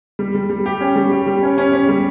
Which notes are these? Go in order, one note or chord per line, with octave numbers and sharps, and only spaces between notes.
G3
G3
G3
G4
C#4
G3
G4
G3
C#4
C#4
C#4
G3